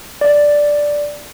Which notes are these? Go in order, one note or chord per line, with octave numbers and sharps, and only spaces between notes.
D5